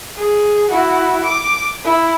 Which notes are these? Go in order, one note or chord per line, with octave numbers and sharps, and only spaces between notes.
G#4
E4 F#4
D6
E4